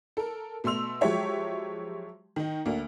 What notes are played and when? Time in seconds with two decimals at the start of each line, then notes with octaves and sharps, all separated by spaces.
0.17 A4 A#4
0.64 B2 A3 C6 E6 F7
1.01 F3 F#3 G#3 G4 C#5 E5
2.36 D#3 D#4
2.65 D2 A#3 D4